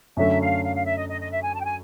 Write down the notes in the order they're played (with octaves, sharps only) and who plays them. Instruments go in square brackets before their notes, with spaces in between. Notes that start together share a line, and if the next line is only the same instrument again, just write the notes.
[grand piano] F#2 D3 F#3 A3 [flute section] E5
[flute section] F5
F5
F5
E5
D#5
D#5
D#5
E5
G#5
A5
G5
G#5